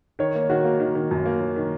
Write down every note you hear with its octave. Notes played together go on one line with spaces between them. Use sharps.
D#3 C#5
A#3
D#3 F#4
A#3
D#3
D#3
F#2
A#3
F#2
D#3